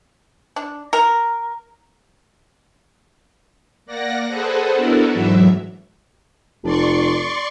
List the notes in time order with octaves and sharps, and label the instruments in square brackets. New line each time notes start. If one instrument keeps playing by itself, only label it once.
[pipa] D4
A#4
[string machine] A#3 D5 F#5 A#6
G#4 A4 B4 C5 F#5
B3 D4 E4 F#4 A4 A#4
G#2 E3 F#3 E5
[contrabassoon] F1 [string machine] D5 C6 C#6